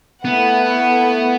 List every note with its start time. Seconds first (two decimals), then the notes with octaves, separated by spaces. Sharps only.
0.25 A3 B3 E4 B4 F#5